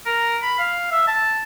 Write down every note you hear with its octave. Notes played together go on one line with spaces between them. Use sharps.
A#4
B5
F5
E5
A5